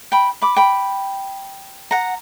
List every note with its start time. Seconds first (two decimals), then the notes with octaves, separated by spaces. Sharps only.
0.12 G5 B5
0.42 B5 D6
0.57 G5 B5
1.91 F#5 A#5